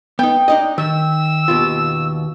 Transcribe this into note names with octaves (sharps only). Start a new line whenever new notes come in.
B3 D#4 G5
D4 D#4 D#5
D#3 E6
D#2 B2 F4